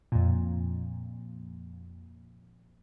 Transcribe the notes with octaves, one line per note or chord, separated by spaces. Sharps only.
F2 A#2